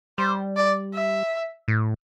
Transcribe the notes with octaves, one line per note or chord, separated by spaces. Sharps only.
G3 C5
D5
E5
A2